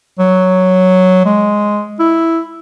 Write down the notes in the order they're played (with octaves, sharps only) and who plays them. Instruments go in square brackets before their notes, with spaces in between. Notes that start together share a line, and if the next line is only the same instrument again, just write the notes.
[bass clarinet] F#3
G#3
E4